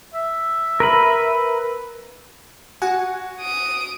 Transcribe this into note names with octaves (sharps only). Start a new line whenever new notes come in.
E5
A#4 B4 B5
F#4 F#5 G#5
D#6 D7